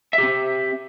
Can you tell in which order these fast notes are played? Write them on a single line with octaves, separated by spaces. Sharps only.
E5 G4 C4